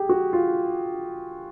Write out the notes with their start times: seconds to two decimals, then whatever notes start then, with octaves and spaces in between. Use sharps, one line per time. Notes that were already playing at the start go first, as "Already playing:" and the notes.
Already playing: G4 G#4
0.09 F#4
0.33 F4